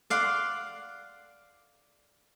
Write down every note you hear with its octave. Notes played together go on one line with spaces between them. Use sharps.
D5 F5 F#5 C6